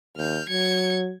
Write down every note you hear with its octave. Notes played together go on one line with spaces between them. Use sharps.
D#2 F6 G6
F#3 G#6 C#7